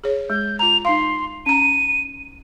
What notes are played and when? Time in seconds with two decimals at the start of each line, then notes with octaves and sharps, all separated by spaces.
0.04 G#4 C#5
0.30 G#3 G6
0.59 F4 A#5 F7
0.85 D#4 F5 C6
1.46 C#4 A#5 D#7